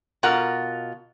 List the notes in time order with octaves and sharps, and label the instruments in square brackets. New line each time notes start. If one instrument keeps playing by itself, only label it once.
[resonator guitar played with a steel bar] B2 F4 A#4 F#5 A#5